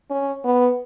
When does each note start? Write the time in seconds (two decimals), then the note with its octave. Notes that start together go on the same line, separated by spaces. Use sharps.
0.11 C#4
0.45 B3